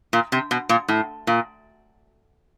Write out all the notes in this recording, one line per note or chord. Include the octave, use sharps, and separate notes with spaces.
A#2
C3
B2
A#2
A2
A#2